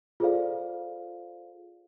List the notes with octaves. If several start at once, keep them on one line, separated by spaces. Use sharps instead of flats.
F4 G#4 A4 C5 D5 F5